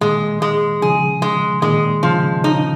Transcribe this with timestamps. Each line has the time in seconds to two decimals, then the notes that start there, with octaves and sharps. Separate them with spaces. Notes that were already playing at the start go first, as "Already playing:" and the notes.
0.01 A#2 D#3 G#3
0.42 G#3
0.81 C#3 F3 G#4
1.22 G#3
1.62 A#2 D#3 G#3
2.03 C#3 F3
2.44 C#3 D#4